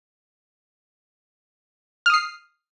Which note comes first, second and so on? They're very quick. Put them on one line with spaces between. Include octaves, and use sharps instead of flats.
F6 D#6 C7